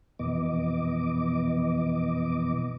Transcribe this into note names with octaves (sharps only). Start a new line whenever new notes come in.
F2 B2 E3 B3 D#5 D6